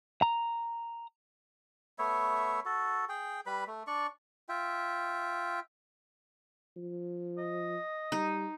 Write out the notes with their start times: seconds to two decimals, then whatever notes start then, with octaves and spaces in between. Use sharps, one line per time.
0.22 A#5
1.99 A3 B3 C#5 E5
2.65 F#4 A4
3.09 G#4 G5
3.46 G3 B4 B5
3.67 A3
3.87 D4 D5 C#6
4.49 F4 E5 G5
6.76 F3
7.38 D#5
8.12 G3 D#4